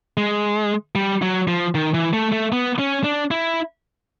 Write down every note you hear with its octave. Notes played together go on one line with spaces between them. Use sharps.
G#3
G3
F#3
F3
D#3
E3
A3
A3
B3
C#4
D4
E4